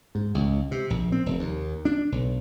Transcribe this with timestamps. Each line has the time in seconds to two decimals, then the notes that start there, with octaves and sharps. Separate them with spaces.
0.15 G#2
0.35 C#2
0.71 C3
0.90 A#1
1.12 C4
1.26 F1
1.39 D#2
1.85 D4
2.12 B1